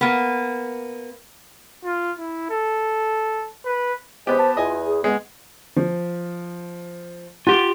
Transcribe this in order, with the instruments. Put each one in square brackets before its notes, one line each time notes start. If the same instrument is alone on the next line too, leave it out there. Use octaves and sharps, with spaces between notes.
[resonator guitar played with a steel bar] A#3 B3
[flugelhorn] F4
E4
A4
B4
[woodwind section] E2 G#3 [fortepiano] B3 G4 [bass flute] C5
[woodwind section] A5
[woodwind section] E2 [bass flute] F4 [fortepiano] D#5 G#5
[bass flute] G#4
[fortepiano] G#3 [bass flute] B3
[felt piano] F3
[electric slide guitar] F4 G4 [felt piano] F#5